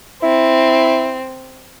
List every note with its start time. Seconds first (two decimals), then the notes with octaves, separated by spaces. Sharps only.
0.23 C4 E4